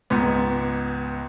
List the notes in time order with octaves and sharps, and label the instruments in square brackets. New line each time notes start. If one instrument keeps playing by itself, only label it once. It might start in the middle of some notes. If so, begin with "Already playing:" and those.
[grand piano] C#2 G#2 B3